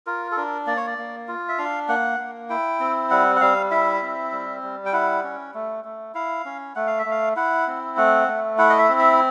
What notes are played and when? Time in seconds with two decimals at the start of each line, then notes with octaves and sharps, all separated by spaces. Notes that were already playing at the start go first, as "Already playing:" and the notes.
0.06 F4 A#4
0.32 A4
0.37 D4 A#4
0.67 A#3 D5
0.77 C#5
0.87 D5
0.98 A#3
1.28 F4
1.49 E5
1.58 D4 F5
1.89 A#3 F#5
2.19 A#3
2.50 E4 G5
2.80 C4
3.10 G3 F#5
3.36 F#5
3.41 G3 F5
3.71 E4 E5
4.02 C4
4.32 G3
4.63 G3
4.86 G5
4.93 E4 F#5
5.24 C#4
5.54 A3
5.84 A3
6.14 E4 F5
6.45 C#4
6.76 A3 F#5
6.87 F5
6.99 E5
7.06 A3 F5
7.36 E4 F#5
7.67 C4
7.97 A3 F#5
8.28 A3
8.58 E4 F#5
8.70 D#5
8.79 E5
8.89 C4
8.99 E5